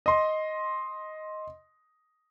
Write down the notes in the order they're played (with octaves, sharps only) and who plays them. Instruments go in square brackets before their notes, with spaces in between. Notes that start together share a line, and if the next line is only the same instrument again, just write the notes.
[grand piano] D#5 C6